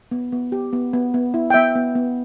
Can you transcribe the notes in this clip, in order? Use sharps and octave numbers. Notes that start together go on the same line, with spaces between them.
B3
B3
G4
B3
B3
B3
E4
G5
B3 E5
B3
B3